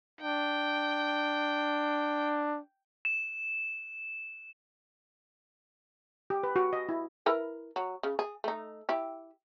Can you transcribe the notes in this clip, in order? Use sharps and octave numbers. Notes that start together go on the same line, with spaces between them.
D4 G5
E7
G4
B4
F#4
D#5
E4
E4 A#4 B4
F#3
C#3
G#4
A3 D#4
E4 G4